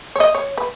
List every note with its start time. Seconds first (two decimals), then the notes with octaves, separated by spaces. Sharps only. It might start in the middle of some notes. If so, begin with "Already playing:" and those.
0.16 C#5
0.20 D#5
0.35 C#5
0.58 B4